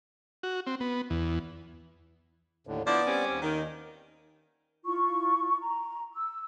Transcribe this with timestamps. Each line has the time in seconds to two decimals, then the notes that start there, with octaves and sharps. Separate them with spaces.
0.43 F#4
0.67 C4
0.80 B3
1.10 E2
2.67 D#2 A2 D3
2.87 F3 B3 D4 E4 D5 D6
3.07 G3 C4 C#4
3.30 D#2
3.42 D#3
4.84 E4 F4 C#6
5.61 A#5
6.13 E6